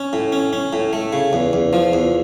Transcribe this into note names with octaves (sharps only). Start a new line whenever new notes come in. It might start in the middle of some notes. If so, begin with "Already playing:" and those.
Already playing: C#4
A2
C#4
C#4
A2
A3
C#3
E2
E2
F3
E2